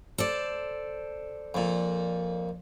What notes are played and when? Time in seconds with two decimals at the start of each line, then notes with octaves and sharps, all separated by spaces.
0.18 A4 C5 D5
1.54 F2 A#2